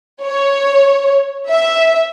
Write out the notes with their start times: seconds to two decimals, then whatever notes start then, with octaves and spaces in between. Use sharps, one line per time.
0.21 C#5
1.49 E5